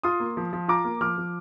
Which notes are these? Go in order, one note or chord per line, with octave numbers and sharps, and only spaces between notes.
F4 C6 D#6
A#3
F3
F3
F4 A#5 D6
A#3
F3 D6 F6
F3